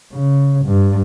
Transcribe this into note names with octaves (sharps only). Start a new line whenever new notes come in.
C#3
G2